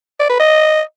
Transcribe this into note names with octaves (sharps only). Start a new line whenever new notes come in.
D5
B4
D#5